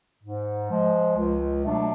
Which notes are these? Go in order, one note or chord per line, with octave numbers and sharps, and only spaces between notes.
G#2
F3 G#3
C#2
B2 F#3 A3 D4